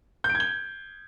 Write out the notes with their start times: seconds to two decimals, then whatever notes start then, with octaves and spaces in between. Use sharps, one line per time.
0.24 G6
0.30 D7
0.35 G#6
0.40 G7